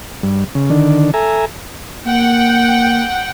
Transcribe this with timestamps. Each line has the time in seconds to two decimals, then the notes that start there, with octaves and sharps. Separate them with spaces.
0.23 G2
0.55 C#3
0.70 D3 D#3 D4
1.14 A4 E5 G#5 A#5
2.06 A#3 F#5 G5